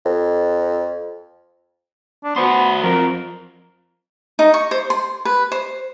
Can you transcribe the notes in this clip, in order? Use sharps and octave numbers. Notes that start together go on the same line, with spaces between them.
F2
D4
B3 F#4 C5
F2 A#4
D#4
C#6
C5
C6
B4
C5